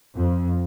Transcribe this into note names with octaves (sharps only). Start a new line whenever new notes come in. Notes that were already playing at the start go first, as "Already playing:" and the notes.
F2